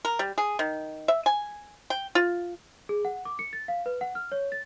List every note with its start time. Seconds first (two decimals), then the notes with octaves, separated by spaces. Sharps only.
0.05 A#4
0.19 G3
0.38 G#4
0.59 D#3
1.08 E5
1.26 G#5
1.90 G5
2.15 F4
2.89 G#4
3.05 F#5
3.25 D6
3.39 C#7
3.53 A6
3.68 F5
3.86 B4
4.01 F#5
4.15 F6
4.32 C#5
4.52 A6